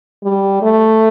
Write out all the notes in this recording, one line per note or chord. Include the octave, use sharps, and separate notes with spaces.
G3
A3